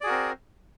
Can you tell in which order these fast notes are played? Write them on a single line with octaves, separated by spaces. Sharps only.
D5 G#4 F#4 A#4 C4